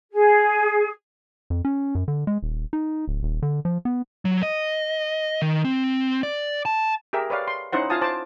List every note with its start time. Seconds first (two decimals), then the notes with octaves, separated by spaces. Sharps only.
0.12 G#4
1.50 F2
1.65 C#4
1.95 F#2
2.08 D3
2.27 G#3
2.43 D#1
2.73 D#4
3.08 D1
3.23 D#1
3.42 D3
3.65 F3
3.85 B3
4.25 F#3
4.43 D#5
5.42 D#3
5.65 C4
6.23 D5
6.65 A5
7.13 G4 G#4 A#4 E5
7.30 B4 C#5 D5 F5
7.48 C6
7.73 C#4 D#4 E4 C5 F#5
7.90 E4 F4 F5 G#5 A5 D#6
8.02 C5 A5 D6